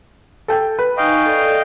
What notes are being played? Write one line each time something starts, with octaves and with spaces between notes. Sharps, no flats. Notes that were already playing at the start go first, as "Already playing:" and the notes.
A4 G5
B4
D#4 D#5 F5 G5 G#5 C#6
A4 D5